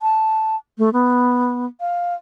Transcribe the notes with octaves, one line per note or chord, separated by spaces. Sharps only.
A5
A3
B3
F5